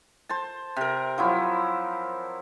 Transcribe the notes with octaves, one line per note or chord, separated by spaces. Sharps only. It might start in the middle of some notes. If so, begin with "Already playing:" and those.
C5 A5
C3 A#4
F3 F#3 E4